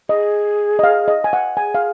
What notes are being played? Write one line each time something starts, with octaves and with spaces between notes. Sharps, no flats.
G#4 D#5
D#5
F5
D#5
G#5
F#5
G#4 G#5
F5